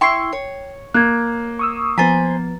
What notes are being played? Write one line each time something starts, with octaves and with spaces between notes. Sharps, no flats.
E4 G5 C6 C#6 C7
C#5
A#3 F#6 G#6
C#6 D#6 E6
F3 B3 C5 G#5 A#5 B5 A6